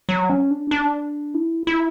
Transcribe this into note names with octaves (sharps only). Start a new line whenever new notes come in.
F#3
C#4
D4
D4
E4
E4